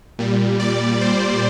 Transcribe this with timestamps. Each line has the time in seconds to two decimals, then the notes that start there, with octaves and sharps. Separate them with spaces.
0.19 A#2 G3
0.60 D5
1.01 C5